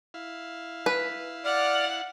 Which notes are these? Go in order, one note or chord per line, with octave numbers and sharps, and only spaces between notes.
E4 F5
B4
D5 F#5 F6